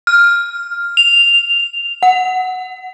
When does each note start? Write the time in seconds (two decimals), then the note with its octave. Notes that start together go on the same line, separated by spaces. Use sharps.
0.07 F6
0.97 F7
2.03 F#5